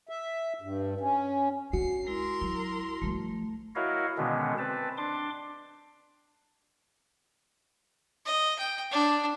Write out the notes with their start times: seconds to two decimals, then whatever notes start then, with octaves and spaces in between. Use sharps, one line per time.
0.09 E5
0.62 G2
1.00 C#4
1.73 D4 F#4 C7
2.07 G#3 E4 A#4 C6
2.42 F#3 E4
3.02 F3 G3 A3
3.76 E4 F#4 A#4 C#5 D#5 F5
4.18 B2 D3 D#3 G#3 B3 C#4
4.58 C4 B4 A5
4.98 D4 C6 D6
8.26 D#5
8.59 G5
8.91 D4